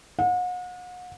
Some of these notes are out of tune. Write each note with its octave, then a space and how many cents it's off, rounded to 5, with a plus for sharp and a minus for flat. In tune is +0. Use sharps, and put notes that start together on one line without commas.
F#5 -40